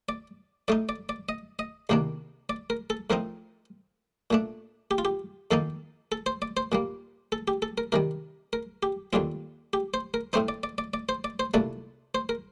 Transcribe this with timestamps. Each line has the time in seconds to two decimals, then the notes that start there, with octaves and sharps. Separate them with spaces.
0.09 D5
0.68 A2 A3 D#4 D5
0.89 D5
1.09 D5
1.29 D#5
1.59 D#5
1.89 C2 C3 D#3 A#3 D4
2.49 D5
2.70 A#4
2.90 A4
3.10 A2 F3 C4 D#4 A#4
4.31 A#2 A3 D4
4.91 G4
4.98 F4
5.05 G4
5.51 F2 D#3 A#3 D#4 A4
6.12 A4
6.26 C5
6.42 D5
6.57 C5
6.72 A#2 G3 A#3
7.32 A4
7.48 G4
7.62 A4
7.78 A#4
7.92 C3 D#3 G3 A#4
8.53 A#4
8.83 G4
9.13 D#2 D3 G3 C4 F4
9.73 G4
9.94 C5
10.14 A#4
10.33 A2 A3 C4 D#4 C5
10.48 D5
10.63 D5
10.78 D5
10.94 D5
11.09 C5
11.24 D5
11.39 C5
11.54 C2 A#2 A3 D4 D5
12.15 C5
12.29 A#4